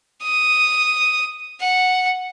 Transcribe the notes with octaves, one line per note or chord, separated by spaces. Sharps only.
D#6
F#5